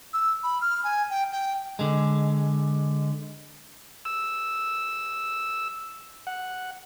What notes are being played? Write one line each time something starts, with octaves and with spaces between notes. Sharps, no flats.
E6
B5
F6
G#5
G5
G5
D3 G#3
E6
F#5